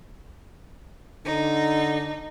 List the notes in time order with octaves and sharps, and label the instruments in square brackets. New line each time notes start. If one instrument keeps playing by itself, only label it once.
[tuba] D3 [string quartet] D#4